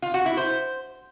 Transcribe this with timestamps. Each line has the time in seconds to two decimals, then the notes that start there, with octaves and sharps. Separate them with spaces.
0.02 F4
0.14 F#4
0.26 E4
0.37 C5